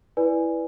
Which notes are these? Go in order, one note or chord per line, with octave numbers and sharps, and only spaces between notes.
E4 B4 D5 G#5